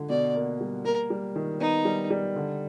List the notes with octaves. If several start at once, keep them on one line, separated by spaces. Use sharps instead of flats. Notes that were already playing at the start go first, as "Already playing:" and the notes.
Already playing: D3
B2 D5
A#3
G3
A#3 A#4
G3
D#3
B3 D#4
G3
G3
D3